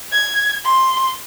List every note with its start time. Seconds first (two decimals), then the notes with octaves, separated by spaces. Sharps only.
0.12 G#6
0.64 C6